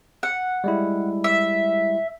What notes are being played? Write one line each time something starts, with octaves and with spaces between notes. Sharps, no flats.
F#5
G3 G#3 E4
E5